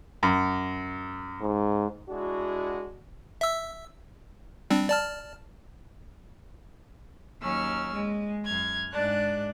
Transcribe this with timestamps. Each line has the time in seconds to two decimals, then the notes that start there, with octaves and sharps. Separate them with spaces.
0.23 F#2
1.41 G#2
2.09 G#3 D4 E4 F#4
3.41 E5 E6
4.70 G3 C4 D4
4.89 D5 A5 F6
7.41 D#2 F#3 C#4 E6 F6
7.93 G#3
8.44 F#2 F6 G#6
8.91 G#2 G#3 D4 D5 F#6